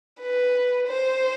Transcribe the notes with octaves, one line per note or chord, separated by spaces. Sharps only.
B4
C5